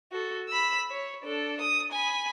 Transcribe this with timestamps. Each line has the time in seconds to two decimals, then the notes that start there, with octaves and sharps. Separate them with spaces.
0.12 F#4 A4
0.48 B5 E6
0.90 C#5
1.24 D4 A4
1.61 D#6
1.92 G#5 B5